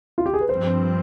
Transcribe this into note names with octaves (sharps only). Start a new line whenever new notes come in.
F4
G4
G#4
B4
G2 F3 C4 C5